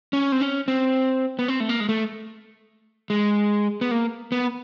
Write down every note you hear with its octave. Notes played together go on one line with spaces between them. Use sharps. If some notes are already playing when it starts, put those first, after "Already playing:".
C#4
C4
C#4
C4
B3
C4
A3
A#3
G#3
A3
G#3
B3
A#3
B3